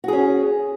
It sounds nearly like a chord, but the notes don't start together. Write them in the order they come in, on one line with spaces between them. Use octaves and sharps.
F#4 G#4 C#4